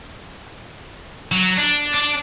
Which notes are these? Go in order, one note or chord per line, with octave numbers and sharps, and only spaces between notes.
F#3
D4
D4